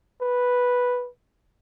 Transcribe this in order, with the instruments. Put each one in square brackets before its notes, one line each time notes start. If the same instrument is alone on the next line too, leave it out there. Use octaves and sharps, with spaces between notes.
[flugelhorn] B4